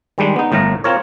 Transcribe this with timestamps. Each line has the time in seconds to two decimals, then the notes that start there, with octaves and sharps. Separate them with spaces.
0.18 D#3 G3 G#3 D4
0.36 B3 D#4
0.52 G1 A2 A3 A#4 A#5
0.84 C4 F4 A#4 C#5